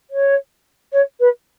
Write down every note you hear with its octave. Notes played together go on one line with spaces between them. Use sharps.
C#5
C#5
B4